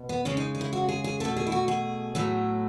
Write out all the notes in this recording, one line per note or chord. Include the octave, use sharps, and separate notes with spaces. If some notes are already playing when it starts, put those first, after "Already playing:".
Already playing: B2
B3
C#3 G#3 C#4
D#4
D#4
E4
F#4
G#4
G#4
B2 A3 A4
G#4
E4
F#4
G#4
A2 F#3 A3